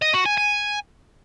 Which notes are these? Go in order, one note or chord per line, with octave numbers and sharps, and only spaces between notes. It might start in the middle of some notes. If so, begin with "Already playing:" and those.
D#5
F#4
G#5
G#5